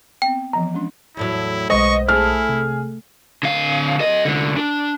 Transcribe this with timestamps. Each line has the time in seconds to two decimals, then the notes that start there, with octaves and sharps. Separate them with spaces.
0.22 B3 C4 G5
0.53 E3 F3 B3 A#5
0.74 G#3 C#4 D4
1.17 E2 A2 F#3 E4
1.70 B1 G#3 B3 C5 D#5 C#6
2.09 A3 E4 G#4 F6
2.49 C3
3.43 D3 F5
4.00 A4 D#5
4.25 C2 D3
4.57 D4